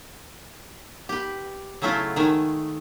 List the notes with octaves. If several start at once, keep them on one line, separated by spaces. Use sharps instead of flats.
G4 B4
C#3 F#3 A3 E4 F4
D#3 G#3 A3